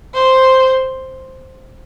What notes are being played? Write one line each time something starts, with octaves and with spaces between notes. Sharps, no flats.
C5